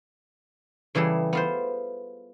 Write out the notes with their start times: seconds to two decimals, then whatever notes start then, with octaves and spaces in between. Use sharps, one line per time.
0.95 C#3 E3 G3 G#4 A4
1.33 B3 F4 C5